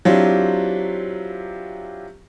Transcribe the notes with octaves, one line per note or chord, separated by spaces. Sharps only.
F#3 C4 D4 E4 F4 G4